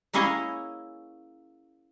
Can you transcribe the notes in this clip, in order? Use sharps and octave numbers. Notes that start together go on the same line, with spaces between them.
A#3 C#4 E4 G#4 C#5 D#5